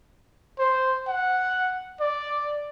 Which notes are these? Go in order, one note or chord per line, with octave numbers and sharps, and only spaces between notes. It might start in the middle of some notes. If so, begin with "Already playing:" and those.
C5
F#5
D5